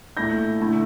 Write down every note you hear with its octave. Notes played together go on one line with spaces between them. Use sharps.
A#2 A3 E4 G6 A#6
D3 A3 E4